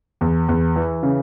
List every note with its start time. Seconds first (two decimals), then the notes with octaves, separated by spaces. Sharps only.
0.21 E2
0.49 E2
0.76 E3
1.03 C#3